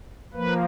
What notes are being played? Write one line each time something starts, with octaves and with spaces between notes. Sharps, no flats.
F3 A#3 B4